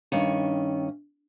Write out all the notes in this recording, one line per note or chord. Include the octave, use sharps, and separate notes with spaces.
G2 D#3 C#4